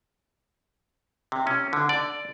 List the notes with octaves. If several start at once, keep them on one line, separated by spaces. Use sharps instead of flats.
C3
C#4
D3
D5